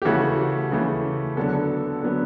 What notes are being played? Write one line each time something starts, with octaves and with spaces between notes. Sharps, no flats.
G4
C#3 E3 A3 F#4
C#3 E3 A3
D3 F#3 B3 A4
D3 F#3 B3